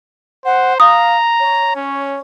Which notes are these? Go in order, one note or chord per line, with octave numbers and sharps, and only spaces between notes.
C5 F#5
F5 A#5 D#6
C#5
C#4